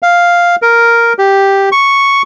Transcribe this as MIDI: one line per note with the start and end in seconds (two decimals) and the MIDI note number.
0.02 0.56 77
0.62 1.13 70
1.18 1.69 67
1.72 2.22 85